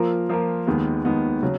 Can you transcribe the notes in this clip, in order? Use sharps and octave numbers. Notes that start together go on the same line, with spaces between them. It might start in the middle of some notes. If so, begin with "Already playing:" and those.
Already playing: F3 A#3 F4 A#4
F3 A#3 F4 A#4
D#2 D#3 G#3 B3
D#2 D#3 G#3 B3
C#3 F#3